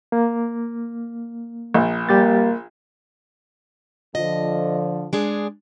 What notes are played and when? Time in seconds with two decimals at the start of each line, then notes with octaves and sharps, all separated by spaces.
0.12 A#3
1.74 A#1
2.09 G3 A#3 G4 A6
4.15 D3 F3 D#5
5.13 G#3 D4 G#4